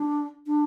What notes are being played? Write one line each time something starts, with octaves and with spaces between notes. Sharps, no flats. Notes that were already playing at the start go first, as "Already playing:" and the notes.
Already playing: D4
D4